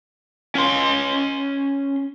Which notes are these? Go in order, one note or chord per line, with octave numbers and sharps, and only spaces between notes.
C#4 C6